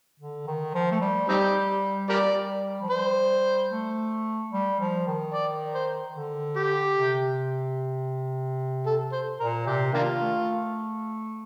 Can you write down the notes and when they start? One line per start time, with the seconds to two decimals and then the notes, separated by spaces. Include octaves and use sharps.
0.20 D3
0.47 D#3
0.74 F3
0.91 A3
1.01 G3
1.28 G3 C4 D#4 G4
2.09 G3 G4 A#4 D5
2.82 F3
2.90 G3 C5
3.71 A3
4.52 G3
4.80 F3
5.07 D#3
5.33 D5
5.75 C5
6.15 D3
6.56 G4
6.96 C3
8.86 A4
9.12 C5
9.39 A#2 A#4
9.66 C3 G4
9.93 D#3 A#3 D4 F4
10.20 A3